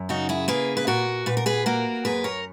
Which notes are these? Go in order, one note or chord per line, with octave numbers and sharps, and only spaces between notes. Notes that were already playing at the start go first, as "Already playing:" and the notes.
Already playing: F#2
C#3 D#4 F#4
E4 G#4
A#3 G#4 B4
B4
A#2 F#4 A#4
A#2 B4
A#4
G#4 B4
A#3 F#4 A#4
F#2 G#4 B4
A#4 C#5